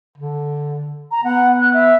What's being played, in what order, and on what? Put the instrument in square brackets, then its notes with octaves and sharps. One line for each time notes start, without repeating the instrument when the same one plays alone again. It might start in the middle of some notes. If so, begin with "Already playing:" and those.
[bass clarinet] D3
[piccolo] A#5
[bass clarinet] B3 [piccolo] F#5
[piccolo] F#6
E5